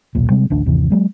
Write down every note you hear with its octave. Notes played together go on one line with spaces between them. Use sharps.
D#1 B1 A#2
C3 G3 G#3 C4
A1 D2 D4
G1 D#2 C3 E3
F#3 G#3 A#3